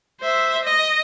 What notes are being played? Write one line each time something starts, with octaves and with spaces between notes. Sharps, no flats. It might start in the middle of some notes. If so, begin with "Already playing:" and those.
C5 E5
D#5